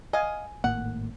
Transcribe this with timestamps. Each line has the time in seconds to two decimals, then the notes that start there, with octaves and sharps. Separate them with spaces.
0.13 D#5 F5 G#5
0.64 G#1 A2 A#3 F#5